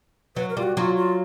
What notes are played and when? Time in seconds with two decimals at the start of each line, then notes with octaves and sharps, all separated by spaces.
0.36 F#3 B4
0.49 A#4
0.57 G3 F4
0.63 F#4
0.77 F#3 F4
0.97 F4